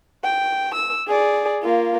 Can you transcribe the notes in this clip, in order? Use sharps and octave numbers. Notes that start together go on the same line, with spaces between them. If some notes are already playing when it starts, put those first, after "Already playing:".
G5
E6
G#4 D5
A#3 F4